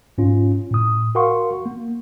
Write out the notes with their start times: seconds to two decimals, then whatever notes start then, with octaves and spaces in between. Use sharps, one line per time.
0.18 G#2 C#4 F4
0.71 A2 D#6
1.15 F#4 A#4 F5 F#5 C6 C#6
1.66 A#3